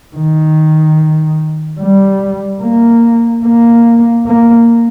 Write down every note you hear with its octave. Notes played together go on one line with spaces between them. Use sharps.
D#3
G3
A#3
A#3
A#3